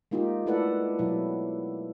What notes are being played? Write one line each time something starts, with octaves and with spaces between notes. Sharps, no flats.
G#3 A#3 D#4 F4 G4
A3 E4 A4 B4 D5 F#5
B2 F#3 E4